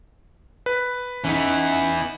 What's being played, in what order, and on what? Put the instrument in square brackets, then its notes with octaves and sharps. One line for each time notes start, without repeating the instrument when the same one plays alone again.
[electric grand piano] B4
[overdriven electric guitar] E3 B3 [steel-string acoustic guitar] C#4 D#4